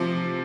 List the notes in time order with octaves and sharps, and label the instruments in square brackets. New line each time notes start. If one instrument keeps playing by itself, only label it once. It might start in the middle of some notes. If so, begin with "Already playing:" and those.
Already playing: [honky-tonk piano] C3 F3